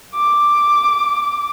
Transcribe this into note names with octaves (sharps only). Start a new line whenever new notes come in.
D6